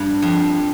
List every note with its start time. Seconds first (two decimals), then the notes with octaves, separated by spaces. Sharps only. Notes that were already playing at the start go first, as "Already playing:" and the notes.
Already playing: G2
0.22 F2